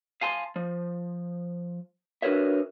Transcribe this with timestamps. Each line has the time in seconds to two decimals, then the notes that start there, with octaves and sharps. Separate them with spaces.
0.21 F5 G#5 A5 C6
0.56 F3
2.22 D4 F#4 A#4 B4 C#5 E5